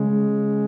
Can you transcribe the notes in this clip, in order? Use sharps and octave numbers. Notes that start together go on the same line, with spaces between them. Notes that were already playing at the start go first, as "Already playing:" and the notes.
Already playing: C#3 G#3